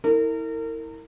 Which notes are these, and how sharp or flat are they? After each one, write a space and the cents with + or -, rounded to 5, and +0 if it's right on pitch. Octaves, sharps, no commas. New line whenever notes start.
E4 -30 A#4 -35